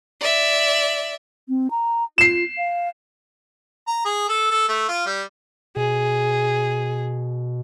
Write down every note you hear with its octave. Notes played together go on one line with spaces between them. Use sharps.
D5 E5
C4
A#5
F4 C7 E7
F5
A#5
G#4
A4
A4
A3
F4
G3
B2 G#4